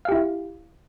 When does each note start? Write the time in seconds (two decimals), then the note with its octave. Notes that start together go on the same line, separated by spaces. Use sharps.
0.05 F5
0.09 G4
0.12 E4